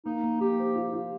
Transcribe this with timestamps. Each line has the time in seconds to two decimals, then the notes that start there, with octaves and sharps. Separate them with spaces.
0.05 A#3 D#4
0.23 A#3
0.41 A#3 G4
0.59 C5
0.76 F4
0.93 F4